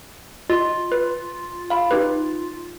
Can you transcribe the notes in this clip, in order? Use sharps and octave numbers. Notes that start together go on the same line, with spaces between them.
F4 D#5
B4
F5 B5
D#4 G4 B4